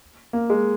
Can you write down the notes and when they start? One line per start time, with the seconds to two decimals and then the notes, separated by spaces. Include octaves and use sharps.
0.33 A#3
0.50 G#3